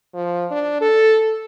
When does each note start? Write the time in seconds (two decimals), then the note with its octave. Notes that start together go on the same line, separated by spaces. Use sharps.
0.14 F3
0.51 D4
0.81 A4